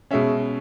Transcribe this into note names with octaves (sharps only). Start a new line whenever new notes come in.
B2 G#3 C#4 E5